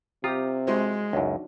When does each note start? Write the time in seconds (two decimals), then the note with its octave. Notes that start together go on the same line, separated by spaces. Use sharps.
0.24 C3 F4 G4 A#5 D#6
0.67 G#3 E4 F#4 C5
1.13 C#2 F#2 D4 D#4 F#4